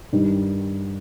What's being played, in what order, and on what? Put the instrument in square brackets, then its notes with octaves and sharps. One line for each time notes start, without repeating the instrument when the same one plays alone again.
[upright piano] G2 D#3 G3